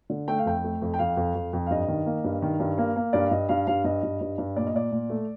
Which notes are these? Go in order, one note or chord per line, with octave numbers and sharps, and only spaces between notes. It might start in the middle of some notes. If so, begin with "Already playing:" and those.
D3
A3 G5
F5
F2 G5
A3
F2
G5
F2 F5
F2
F2
F2
F5
G2 D#5
D#3
A#3
G2
D#3
G2
A#3
A#3
G2 D5
F5
G2 D#5
G2 F5
G2 F5
G2 D#5
G2
G2
G2
A#2 D5
D#5
A#2 D5
A#2
A3